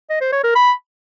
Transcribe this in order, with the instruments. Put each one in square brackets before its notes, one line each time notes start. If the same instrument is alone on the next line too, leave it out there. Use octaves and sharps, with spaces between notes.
[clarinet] D#5
C5
C#5
A#4
B5